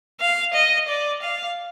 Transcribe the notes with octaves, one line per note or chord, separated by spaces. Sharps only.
F5
D#5
D5
F5